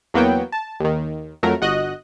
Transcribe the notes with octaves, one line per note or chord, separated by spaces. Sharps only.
E2 F#3 A#3 B3 F#4 G5
A5
D#2 D#3
F2 F#3 A3 A#4
G1 F#4 D#5 F#6